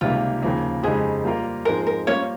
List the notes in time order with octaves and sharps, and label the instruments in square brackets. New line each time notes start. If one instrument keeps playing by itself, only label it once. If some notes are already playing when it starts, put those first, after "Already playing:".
[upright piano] C#2 C3 D#3 G3 A#3 [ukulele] F4
[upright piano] D#2 C#3 F3 A#3
[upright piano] F2 C#3 G#3 D#4 G4 [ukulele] G#4
[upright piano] G3 A#3 F4 A#4
[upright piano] G#2 F3 G#3 C4 [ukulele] A#4
[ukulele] A#4
[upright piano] G3 A#3 F4 C5 [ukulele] C#4 C#5